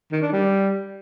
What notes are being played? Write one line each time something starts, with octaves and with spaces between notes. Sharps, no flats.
D#3
D4
G3